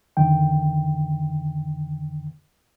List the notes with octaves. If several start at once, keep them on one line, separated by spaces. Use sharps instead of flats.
F2 D3 D#3 G5